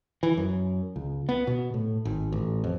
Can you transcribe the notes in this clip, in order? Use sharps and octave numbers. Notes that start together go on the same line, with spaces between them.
E3
F#2
C#2
B3
B2
A2
G#1
A1
F2